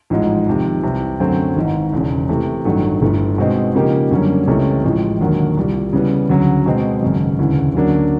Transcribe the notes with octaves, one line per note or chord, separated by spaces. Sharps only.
A1 G#2 F3 G#3
F2 C3 D#3
C2 C3 E3
F#2 D3 F#3 A3 C4
G#1 G#2 E3
E1 E2 C#3
C3 E3 A3
A1 G2 D#3 F#3 A3
G1 G2 E3 A3
B2 G#3 C4 D#4
C#3 F3 A#3 D#4 G4
F#2 D3 G3 A#3 C#4
C#2 C3 E3 A3 C#4
A1 A2 F3 G#3
E1 D#2 D3 F#3 A#3
C2 A#2 G3
C#3 E3 G3 B3
D2 C#3 F#3
B2 G#3 C4
G#1 F#2 C#3
E1 D2 C#3 E3
D2 C#3 F#3 A#3 D4